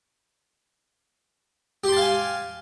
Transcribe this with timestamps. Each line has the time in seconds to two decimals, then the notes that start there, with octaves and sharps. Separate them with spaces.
1.84 G4
1.88 C6
1.92 A5
1.97 F5
2.01 G#5